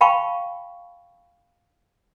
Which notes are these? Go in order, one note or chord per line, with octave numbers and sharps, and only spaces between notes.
F5 G5 A5 B5 C#6